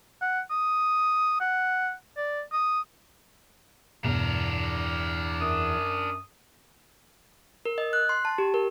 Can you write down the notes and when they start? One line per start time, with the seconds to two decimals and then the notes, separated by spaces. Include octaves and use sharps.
0.21 F#5
0.50 D#6
1.40 F#5
2.17 D5
2.52 D#6
4.04 E2 G2 B2 B3 D4 A#4
5.40 F#2 D#6
7.65 A#4
7.78 D#5
7.93 F#6
8.09 C6
8.25 A5
8.38 G4
8.54 A#4